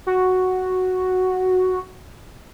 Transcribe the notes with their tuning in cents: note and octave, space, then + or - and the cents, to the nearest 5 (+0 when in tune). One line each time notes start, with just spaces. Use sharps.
F#4 +0